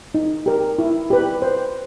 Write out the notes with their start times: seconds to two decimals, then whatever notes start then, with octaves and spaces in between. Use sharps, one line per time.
0.14 D#4
0.46 G4 A#4
0.79 E4
1.10 G4 B4
1.42 C5